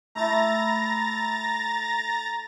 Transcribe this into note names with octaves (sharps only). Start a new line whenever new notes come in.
A3 E4 A#5 A6 A#6